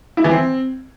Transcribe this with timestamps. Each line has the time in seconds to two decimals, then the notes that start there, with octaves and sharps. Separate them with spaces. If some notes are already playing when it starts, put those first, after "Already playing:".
0.17 E4
0.24 E3
0.31 C4